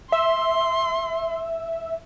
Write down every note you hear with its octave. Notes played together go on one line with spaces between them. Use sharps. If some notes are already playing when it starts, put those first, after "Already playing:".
E5 C6